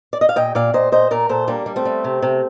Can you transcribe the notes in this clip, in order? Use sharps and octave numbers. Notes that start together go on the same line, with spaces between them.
D5
D#5
F5
A#2 D#5 G5
A#2 D5 F5
A#2 C5 D#5
A#2 C5 D#5
A#2 A#4 D5
A#2 A4 C5
G3 A#3 D4
G3
A3 C4
G3
C3
C3